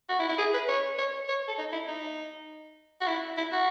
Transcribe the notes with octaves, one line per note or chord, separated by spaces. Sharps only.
F#4
E4
E4
G#4
B4
C#5
C#5
C#5
A4
D#4
E4
D#4
F#4
E4
E4
F#4